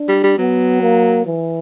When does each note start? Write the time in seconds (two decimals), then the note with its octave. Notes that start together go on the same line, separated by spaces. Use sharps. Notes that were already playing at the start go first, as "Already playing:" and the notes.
Already playing: D4
0.08 G3
0.23 G3
0.38 F#3 B3
0.82 A#3
1.26 E3